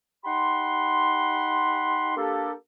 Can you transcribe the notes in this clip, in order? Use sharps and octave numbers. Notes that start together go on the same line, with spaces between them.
D#4 G4 F#5 B5 C6
A#3 D4 G4 A4